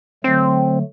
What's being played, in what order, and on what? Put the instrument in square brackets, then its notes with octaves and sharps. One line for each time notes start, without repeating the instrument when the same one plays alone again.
[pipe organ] D3 F#3 A3 [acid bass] C4